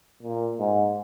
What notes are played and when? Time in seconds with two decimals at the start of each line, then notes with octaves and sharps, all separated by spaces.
0.23 A#2
0.59 G#2